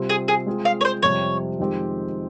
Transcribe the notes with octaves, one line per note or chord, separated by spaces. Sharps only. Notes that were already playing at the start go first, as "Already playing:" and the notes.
Already playing: C3 G3 C4 F4
G#4
G#4
G#3 C4 F4 G#4
F5
C#5
C5
F2 C3 G3 C#5
F2 D#3 G#3 C4 G4